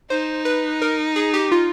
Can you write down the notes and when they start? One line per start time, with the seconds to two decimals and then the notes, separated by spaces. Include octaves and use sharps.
0.10 D#4 C5
0.45 B4
0.82 A#4
1.16 G#4
1.34 G4
1.52 F4